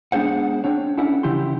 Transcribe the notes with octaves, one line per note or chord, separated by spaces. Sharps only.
G#3 B3 D4 G#4 C5 F#5
C4 D4 C#5
C#4 D4 E4 A4 F#5
C#3 E3 E4 G4 C6